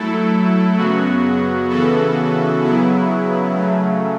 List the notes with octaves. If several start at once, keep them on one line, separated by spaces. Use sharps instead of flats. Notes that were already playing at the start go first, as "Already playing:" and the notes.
Already playing: F#3 A3 E4 A4
F#2 C#3 F#3 B3 F#4
C#3 E3 B3 F#4 A4
C#3 F#3 B3 E4
C#3 F#3 A3